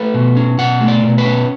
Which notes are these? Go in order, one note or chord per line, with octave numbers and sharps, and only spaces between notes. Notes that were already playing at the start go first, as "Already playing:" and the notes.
Already playing: A3 B4
B2
C#4
B2 F#5
A3
D5
B2
B4
C#4